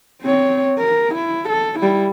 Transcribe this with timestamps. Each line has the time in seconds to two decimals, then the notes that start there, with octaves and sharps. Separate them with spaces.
0.22 C4 C#5
0.79 A#4
1.15 E4
1.49 A4
1.79 G3 E4